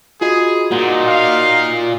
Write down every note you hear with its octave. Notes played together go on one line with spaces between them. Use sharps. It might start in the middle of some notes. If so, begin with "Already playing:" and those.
F4 F#4 G#4 D#5
A#2 D#4 F#4 D#5 F#5
F5